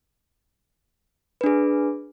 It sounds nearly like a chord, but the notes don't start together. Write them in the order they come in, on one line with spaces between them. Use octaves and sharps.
B4 D4 G#4